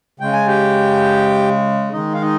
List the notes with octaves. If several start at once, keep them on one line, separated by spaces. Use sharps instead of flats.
C#3 G#3 G5
G#5
G4 G5
D#3 G#3 D#4 D#5
F5
D#4 D#5